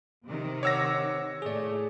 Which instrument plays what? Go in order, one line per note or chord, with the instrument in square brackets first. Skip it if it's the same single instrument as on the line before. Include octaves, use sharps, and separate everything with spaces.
[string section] C3 D#3
[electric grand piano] C#5 E6 A#6 [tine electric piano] F#5 D6
[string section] A2 A3 [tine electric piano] G#4 D5